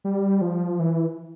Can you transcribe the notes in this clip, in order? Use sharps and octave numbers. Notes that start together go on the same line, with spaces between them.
G3
F3
E3